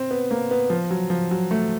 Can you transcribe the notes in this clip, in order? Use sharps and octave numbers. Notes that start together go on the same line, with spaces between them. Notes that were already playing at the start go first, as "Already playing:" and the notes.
Already playing: C4
B3
A#3
B3
F3
F#3
F3
F#3
A3